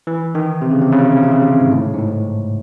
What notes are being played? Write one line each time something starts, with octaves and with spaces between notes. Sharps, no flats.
E3
D#3
C3
C#3
C3
C#3
C3
C#3
C3
C#3
C3
G#2
A2
G#2
A2